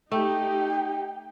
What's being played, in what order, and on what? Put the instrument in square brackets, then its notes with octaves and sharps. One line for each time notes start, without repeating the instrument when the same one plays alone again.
[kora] A3 [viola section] D#4 G4 [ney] G5